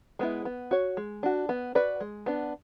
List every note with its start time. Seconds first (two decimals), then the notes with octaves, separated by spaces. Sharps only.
0.19 G#3 B3 E4
0.45 B3
0.71 F#4 C#5
0.97 G#3
1.23 D4 F#4
1.49 B3
1.75 F#4 B4 D5
2.01 G#3
2.26 B3 D4